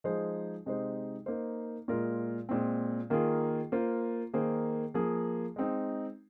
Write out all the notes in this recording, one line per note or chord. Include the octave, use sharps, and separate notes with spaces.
F3 G#3 D#4 G#4 C5
C3 G#3 D#4 C5
A#3 D#4 C5
A#2 G#3 F4 A#4
A#2 G#3 C4
D#3 A#3 F4 G#4
A#3 F4 C5
D#3 A#3 G#4 C5
F3 A#3 G#4
G#3 C4 D#4